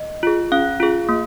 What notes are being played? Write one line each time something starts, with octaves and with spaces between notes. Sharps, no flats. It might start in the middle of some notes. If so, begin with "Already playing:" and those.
Already playing: D#5
F4 G#4
C#4 F5
F4 G#4
A#3